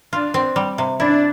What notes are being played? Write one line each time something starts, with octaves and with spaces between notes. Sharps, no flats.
D4 F4
C4
G3
C3
D4 E4